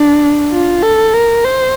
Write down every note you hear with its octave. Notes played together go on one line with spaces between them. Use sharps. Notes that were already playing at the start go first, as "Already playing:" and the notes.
Already playing: D4
F4
A4
A#4
C5